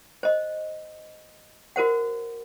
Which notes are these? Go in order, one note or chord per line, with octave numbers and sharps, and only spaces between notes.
C5 D#5
F#4 A#4 C5 F#5